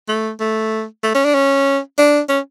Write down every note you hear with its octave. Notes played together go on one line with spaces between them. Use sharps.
A3
A3
A3
C#4
D4
C#4
D4
C#4